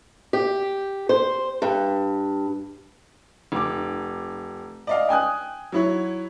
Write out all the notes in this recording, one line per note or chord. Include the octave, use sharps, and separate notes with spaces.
G4
C5
G2
F1 D6
D5 D#5 F5
G5 G#5 D#6 F#6
F#3 E4 C#5